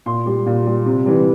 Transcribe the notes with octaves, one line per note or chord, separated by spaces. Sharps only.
A#2 C6
G3
A#2
G3
C3
E3 G3